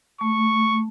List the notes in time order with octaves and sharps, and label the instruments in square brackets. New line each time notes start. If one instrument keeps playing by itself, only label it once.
[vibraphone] A3 [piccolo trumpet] C#6